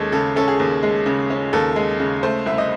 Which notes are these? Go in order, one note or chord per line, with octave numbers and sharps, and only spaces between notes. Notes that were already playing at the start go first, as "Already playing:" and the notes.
Already playing: D#2 G#3 C#4 A4 C#5
C#3 A4
C#4 A4
G#4
D#2
G#3
C#3
C#4
D#2 A4
G#3
C#3
A3 C5
C2 E5
D#5